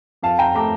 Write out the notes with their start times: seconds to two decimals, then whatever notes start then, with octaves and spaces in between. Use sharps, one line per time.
0.23 F2 F5 A5
0.39 G5 A#5
0.55 A3 A#5 D6